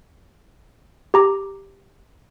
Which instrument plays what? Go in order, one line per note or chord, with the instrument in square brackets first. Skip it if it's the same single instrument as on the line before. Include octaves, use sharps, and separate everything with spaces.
[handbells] G4 A#5 D6